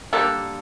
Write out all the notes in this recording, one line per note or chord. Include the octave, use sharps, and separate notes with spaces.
D3 G3 A#3 A4